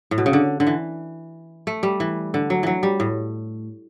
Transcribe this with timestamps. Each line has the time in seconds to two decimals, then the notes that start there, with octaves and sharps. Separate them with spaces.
0.11 A2
0.18 B2
0.26 C#3
0.33 D3
0.60 D3
0.67 E3
1.67 A3
1.83 G3
2.00 E3
2.34 D3
2.50 F#3
2.63 E3 F#3
2.83 G3
3.00 A2